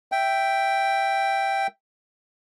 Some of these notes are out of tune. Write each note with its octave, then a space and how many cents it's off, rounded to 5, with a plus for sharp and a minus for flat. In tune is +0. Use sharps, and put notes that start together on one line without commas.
E5 +5 G5 +0